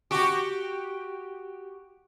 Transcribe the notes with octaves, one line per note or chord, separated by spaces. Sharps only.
F#4 G4